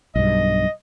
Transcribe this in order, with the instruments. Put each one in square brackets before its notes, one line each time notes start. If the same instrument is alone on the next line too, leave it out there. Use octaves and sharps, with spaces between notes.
[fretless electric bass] B1 G2 [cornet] D#5